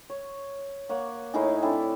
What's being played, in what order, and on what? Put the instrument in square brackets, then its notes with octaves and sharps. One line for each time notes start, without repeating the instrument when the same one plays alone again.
[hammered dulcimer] C#5
A#3 C#5 F#5
A2 D#4 E4 G#4
C4 D4 E4 A4